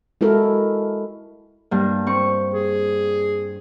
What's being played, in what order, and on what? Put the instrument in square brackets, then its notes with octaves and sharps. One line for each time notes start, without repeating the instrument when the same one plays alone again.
[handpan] G#3 E4 F#4 A4 A#4
[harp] G2 A#3
C4 C#6
[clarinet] G#4